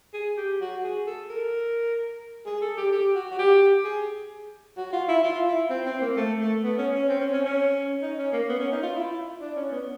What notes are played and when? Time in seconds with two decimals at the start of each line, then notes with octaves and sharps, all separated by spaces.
0.13 G#4
0.37 G4
0.60 F#4
0.83 G#4
1.06 A4
1.29 A#4
2.46 G#4
2.61 A4
2.77 G4
2.92 G4
3.15 F#4
3.31 F#4
3.39 G4
3.84 G#4
4.77 F#4
4.93 F4
5.08 E4
5.23 F4
5.47 E4
5.70 C4
5.86 C4
6.01 A#3
6.16 A3
6.40 A3
6.63 B3
6.78 C#4
6.94 C#4
7.09 C4
7.20 C#4
7.33 C#4
7.44 C#4
8.02 D#4
8.18 C#4
8.33 A#3
8.49 B3
8.60 C#4
8.72 D#4
8.83 F4
8.95 E4
9.41 D4
9.56 C#4
9.72 B3